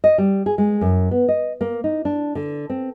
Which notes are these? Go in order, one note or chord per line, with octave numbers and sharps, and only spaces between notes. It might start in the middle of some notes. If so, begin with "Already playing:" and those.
D#5
G3
G#4
G#3
F#2
B3
D#5
A#3
D#4
D4
D3
C4